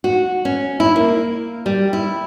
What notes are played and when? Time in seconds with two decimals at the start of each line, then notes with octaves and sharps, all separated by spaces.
0.04 F#4
0.45 C#4
0.80 E4
0.96 A#3
1.66 G3
1.93 E4